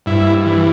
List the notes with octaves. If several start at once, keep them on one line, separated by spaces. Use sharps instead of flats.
G2 E4
E3